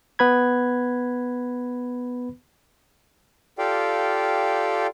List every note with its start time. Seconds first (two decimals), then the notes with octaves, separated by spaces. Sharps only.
0.19 B3 B4 B5 G#6
3.58 F4 G4 A4 D5 F5 G5